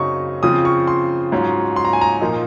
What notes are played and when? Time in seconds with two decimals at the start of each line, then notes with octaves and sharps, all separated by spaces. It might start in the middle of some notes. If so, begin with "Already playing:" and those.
Already playing: F#2 C#3 F#3 C4 D#4 C#6 D#6
0.43 C#3 F3 C4 F4 D#6
0.65 C#6
0.87 C6
1.32 G#2 F#3 C#4 F4
1.76 C6
1.85 A#5
1.93 G#5
2.01 A#5
2.21 A#2 F3 A#3 D#4